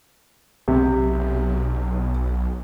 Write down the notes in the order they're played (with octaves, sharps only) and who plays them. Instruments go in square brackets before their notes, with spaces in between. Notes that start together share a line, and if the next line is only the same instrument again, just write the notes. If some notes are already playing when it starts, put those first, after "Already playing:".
[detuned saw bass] B1 [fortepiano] C3